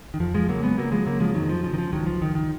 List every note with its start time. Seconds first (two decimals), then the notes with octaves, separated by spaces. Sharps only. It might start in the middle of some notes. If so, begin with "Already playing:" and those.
0.14 D#3
0.20 F2 F3
0.34 F3 G#3
0.49 C#3 F#3 A#3
0.63 G#3 B3
0.78 C#3 F#3 A#3
0.92 F3 G#3
1.06 C#3 F#3 A#3
1.20 F3 G#3
1.34 F2 D#3 F#3
1.49 F3
1.63 C#3 F3
1.74 D#3
1.78 F3
1.92 C#2 D#3 F#3
2.06 F3
2.21 C#2 D#3
2.35 D#3